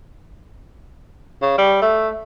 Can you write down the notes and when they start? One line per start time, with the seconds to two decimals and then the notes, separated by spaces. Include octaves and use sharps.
1.42 C#3
1.58 G3
1.82 A3